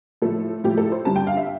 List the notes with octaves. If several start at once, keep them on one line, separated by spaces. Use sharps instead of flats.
A2 F3 A3 A4
A2 F3 A3 G4
A4
C5
G2 D3 G3 A5
G5
F5
E5